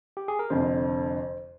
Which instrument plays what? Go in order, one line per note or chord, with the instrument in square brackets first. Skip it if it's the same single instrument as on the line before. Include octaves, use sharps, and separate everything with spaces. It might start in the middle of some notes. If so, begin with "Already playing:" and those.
[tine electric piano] G4
G#4
A#4
[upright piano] F1 F2 D3 [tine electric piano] C5